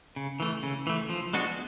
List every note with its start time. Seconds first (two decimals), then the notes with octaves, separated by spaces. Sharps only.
0.16 C#3
0.40 E3 A3
0.63 C#3
0.87 E3 A3
1.10 F3
1.33 G#3 B3 D4 F#4